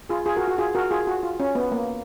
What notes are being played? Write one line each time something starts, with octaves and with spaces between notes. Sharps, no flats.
F4 G#4
F4 G#4
F#4 A#4
F#4
F4 G#4
F#4 A#4
F4 G#4
F#4
F4
C#4
B3
A#3